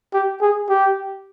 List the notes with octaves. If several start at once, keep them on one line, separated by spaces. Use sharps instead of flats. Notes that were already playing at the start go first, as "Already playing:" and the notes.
G4
G#4
G4